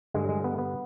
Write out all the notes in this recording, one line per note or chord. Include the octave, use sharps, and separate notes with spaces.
G2 D3 G#3
G#3
B3
B3